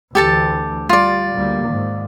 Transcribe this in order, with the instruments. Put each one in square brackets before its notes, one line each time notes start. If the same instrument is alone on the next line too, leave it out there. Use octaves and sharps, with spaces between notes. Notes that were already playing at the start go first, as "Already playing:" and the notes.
[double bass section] D2 E3 [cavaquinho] G4 A4 A5
[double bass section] G3 [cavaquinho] F4 D5
[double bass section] D2 G3 A#3
G#2 D#3